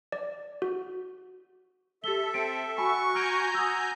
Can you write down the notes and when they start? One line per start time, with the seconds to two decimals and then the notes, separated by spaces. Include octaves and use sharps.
0.12 D5
0.62 F#4
2.04 G4 A4 E5 G7
2.34 C4 C#7 D7
2.78 F#4 G#5 B5 C#6 E6
3.15 G#5 A#5 F6 G6 D7
3.55 F#4 D#6 E6